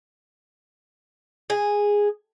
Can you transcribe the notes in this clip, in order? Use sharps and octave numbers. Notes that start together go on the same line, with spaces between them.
G#4